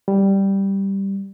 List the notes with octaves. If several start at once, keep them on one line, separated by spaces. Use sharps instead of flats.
G3